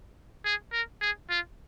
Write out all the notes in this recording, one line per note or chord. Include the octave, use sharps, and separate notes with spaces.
G#4
A#4
G#4
F4